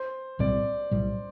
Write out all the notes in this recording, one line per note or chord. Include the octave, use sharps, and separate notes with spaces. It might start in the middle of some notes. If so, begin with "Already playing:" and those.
Already playing: C5
B1 A2 G3 C4 D5
B1 A2 G3